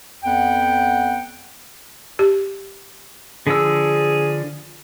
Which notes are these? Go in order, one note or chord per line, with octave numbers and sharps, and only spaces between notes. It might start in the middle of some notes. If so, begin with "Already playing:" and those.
F2 B3 F#5 G5
G4
D3 F3 G#4 E6